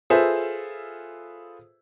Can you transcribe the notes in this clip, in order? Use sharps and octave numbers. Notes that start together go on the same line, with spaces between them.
F4 G#4 A4 B4 C5 E5